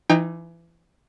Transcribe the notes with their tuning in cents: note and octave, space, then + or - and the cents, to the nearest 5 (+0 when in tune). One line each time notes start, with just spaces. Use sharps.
E3 +30 D#4 +0 G5 +35